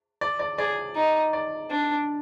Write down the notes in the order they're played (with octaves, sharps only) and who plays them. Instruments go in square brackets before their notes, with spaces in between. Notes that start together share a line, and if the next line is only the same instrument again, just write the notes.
[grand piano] D5
D5
[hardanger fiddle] G#4 [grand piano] D5
[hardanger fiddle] D#4
[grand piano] D5
[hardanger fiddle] D4